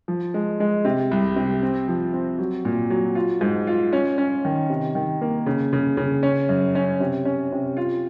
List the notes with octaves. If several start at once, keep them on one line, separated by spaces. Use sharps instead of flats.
F3
G#3
G#3
C3
C2
C3
C4
F3
C4
F#3
A#2
F#3
F4
G#2
F4
C#4
C#4
D#3
C3
D#3
A#3
C#3
C#3
C#3
C#4
F#2
C#4
C3
C#4
C3
F4